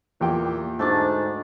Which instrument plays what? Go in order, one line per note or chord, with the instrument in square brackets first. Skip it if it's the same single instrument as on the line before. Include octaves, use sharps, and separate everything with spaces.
[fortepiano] E2 G4 G5 [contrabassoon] A#2
[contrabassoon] D2 [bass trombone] G#2 [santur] A3 D4 A5